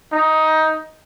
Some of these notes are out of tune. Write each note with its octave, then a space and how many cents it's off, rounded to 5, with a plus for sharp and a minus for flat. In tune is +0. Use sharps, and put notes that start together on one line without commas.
D#4 +15